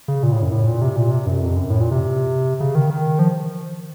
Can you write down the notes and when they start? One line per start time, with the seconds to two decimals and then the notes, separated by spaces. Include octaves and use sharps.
0.08 C#3
0.23 A#2
0.32 A2
0.42 F#2
0.52 A2
0.67 A#2
0.82 C3
0.96 A#2
1.11 C3
1.26 F#2
1.42 F2
1.56 F#2
1.70 A2
1.80 A#2
1.91 C3
2.60 C#3
2.75 D#3
2.90 D#3
3.19 F3